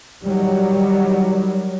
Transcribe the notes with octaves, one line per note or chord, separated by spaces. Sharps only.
D#3 F#3 G3